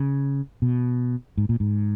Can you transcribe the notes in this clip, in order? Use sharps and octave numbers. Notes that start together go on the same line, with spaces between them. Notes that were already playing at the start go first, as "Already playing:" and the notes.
Already playing: C#3
B2
G#2
A#2
G#2